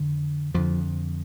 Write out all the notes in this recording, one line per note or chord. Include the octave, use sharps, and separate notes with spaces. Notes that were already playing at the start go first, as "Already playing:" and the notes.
Already playing: F2 D3
F2 D3 F3